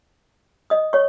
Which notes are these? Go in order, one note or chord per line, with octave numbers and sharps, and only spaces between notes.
D#5 D#6
C#5 C#6